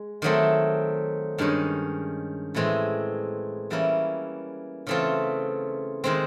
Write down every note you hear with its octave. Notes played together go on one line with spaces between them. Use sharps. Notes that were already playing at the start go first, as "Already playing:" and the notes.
Already playing: G#3
D#3 F#3 A3 C4
G2 D#3 G#3 C#4
A2 E3 G#3 C4
E3 G3 A#3 C#4 E4
C#3 E3 A3 C4 F4
D#3 G#3 C4